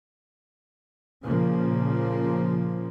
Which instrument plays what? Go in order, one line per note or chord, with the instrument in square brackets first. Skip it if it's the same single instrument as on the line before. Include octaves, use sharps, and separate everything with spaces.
[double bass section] A#2 C#3 F3 A#3